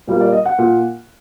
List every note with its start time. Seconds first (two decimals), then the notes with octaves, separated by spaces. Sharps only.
0.07 A#2 G3 A#3
0.21 D5
0.32 D#5
0.45 F#5
0.59 A#2